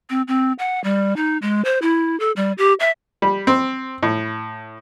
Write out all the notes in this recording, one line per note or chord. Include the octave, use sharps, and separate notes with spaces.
C4
C4
F#5
G3
D#4
G#3
C5
E4
A4
G3
G4
E5
G3
C4
A2